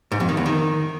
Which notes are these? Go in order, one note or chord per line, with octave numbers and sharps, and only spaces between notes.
G#2
F2
D#3
E2
D#3